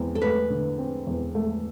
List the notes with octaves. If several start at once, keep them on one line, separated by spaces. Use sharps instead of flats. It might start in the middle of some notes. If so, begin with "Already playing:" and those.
Already playing: E2 C4
A4
A3 B4
D3
C4
E2
A3